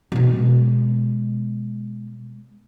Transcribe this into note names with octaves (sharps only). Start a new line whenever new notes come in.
B2 G#3